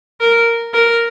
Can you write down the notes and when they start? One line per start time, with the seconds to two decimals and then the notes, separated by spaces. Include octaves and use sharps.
0.21 A#4
0.74 A#4